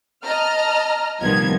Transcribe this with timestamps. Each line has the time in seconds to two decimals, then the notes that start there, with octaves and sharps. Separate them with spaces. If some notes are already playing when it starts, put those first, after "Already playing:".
0.24 D#5 A5 A#5 F6
1.21 C2 A#2 D#3 F3 B3 G#6